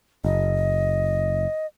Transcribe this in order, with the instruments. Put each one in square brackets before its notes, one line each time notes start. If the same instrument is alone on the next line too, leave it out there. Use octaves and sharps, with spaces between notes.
[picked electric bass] F#1 [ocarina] D#5